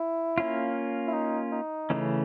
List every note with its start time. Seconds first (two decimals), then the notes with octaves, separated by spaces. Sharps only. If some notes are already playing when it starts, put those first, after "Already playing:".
Already playing: E4
0.38 A#3 C#4 F4
1.07 E4
1.13 D#4
1.52 D#4
1.90 C#3 E3 A3 C#4